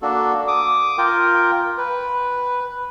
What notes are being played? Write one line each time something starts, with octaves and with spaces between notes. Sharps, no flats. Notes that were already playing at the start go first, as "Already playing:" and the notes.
A#3 D4 F#4 A4
D6 D#6
F4 A#4 G5
B4